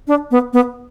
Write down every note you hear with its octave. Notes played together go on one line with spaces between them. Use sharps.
D4
B3
B3